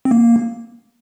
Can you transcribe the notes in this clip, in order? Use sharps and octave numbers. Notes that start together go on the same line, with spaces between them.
C4
A#3